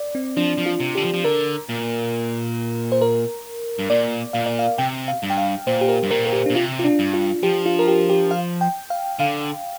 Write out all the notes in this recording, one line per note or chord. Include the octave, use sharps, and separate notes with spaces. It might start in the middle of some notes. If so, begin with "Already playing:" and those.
Already playing: D5
C4
F3 D4
F3
F4
C3
D3 G4
F3
F3
D3 A#4
A#2
C5
A#4
G2
A#2 D5
A#2 F5
D5
F5
C3 G5
F5
G2
G5
F5
A#2 C5
G4
A#4
G2
A#2 A#4
A#4
G4
D4
A#2
C3 F4
F4
D4
G2
F4
F3 G4
F4
A#4
G4
G4
F5
G5
F5
D3 F5